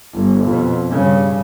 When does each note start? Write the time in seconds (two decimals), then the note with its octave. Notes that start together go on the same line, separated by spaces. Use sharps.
0.14 G1
0.45 F2 B2
0.90 G2 C#3